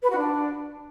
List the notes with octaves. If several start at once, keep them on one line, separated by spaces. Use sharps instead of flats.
B4
F#4
D4